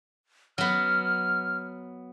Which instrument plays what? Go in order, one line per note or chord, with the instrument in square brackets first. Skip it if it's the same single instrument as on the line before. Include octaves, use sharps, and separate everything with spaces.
[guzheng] F#3 B3 [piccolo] F6